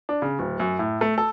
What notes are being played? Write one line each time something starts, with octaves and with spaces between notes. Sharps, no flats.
D4
C#3
D1
F#2
A2
A3
A4